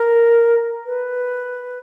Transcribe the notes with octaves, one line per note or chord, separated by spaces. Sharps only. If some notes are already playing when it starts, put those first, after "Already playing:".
Already playing: A#4
B4